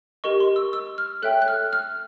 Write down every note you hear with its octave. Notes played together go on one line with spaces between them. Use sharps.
G4 A#4 D#5 C#6
C6
E6
E6
F6
A4 C#5 E5 G5 F#6
F#6
F6
F6